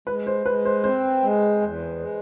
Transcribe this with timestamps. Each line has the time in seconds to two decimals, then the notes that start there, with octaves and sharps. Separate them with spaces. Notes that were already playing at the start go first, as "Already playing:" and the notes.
0.07 G#3 B4
0.27 C5
0.46 G#3 B4
0.65 C5
0.84 C4 C5
1.22 G#3
1.61 E2
1.99 G#3